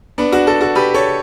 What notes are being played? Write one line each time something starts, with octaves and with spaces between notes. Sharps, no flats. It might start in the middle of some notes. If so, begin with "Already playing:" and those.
B3 D4
D4 F#4
F#4 A4
F#4 A4
G4 B4
A4 C#5